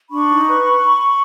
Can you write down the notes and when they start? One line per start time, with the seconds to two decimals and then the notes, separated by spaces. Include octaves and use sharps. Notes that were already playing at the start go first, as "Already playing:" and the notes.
0.10 D4 B5 C#6
0.28 D#4
0.47 B4